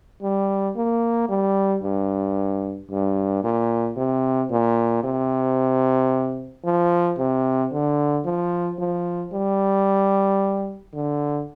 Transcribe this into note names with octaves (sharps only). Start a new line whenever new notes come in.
G3
A#3
G3
G2
G2
A#2
C3
A#2
C3
F3
C3
D3
F3
F3
G3
D3